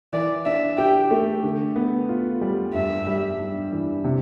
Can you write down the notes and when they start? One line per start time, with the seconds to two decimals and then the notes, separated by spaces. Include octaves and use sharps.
0.13 E3 D5
0.45 D4 E5
0.78 G4 G5
1.11 A3
1.43 D3
1.76 B3
2.09 F4
2.41 G3
2.74 G2 E5
3.07 G3
3.39 D4
3.72 E3
4.04 C3